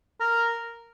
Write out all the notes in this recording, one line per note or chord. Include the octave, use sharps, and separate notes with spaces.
A#4